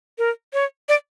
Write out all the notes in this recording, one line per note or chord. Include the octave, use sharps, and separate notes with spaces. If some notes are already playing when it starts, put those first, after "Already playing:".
A#4
C#5
D5